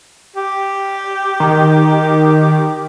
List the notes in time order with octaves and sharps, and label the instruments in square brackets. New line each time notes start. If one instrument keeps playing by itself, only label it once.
[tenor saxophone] G4
[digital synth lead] D#3